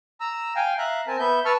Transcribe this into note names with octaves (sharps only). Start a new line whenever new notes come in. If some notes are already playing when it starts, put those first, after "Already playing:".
A#5 E6
F5 G5 G#5
E5 F5 A#5 F#6
C4 A#4 G#5 A5
B3 E5 G6
B4 A5 C#6 E6 F6